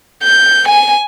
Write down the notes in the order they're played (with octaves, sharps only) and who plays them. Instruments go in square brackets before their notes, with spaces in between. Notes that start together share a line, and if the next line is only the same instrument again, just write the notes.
[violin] G6
G#5